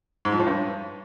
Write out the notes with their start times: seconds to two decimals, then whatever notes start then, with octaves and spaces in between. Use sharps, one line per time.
0.25 G#2
0.32 F3
0.39 A2
0.47 G2